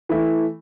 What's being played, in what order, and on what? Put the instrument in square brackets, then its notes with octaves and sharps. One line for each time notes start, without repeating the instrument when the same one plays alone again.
[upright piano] E3 A3 E4